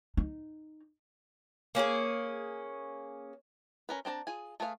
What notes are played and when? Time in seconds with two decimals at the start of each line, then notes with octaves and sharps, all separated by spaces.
0.17 D#4
1.75 A#3 C#4 F#4 G#4
3.89 C#4 A#4 B4
4.05 C4 D4 C5 A5 A#5
4.27 F4 G#4 G#5
4.60 A3 G#4 B4 C#5 F5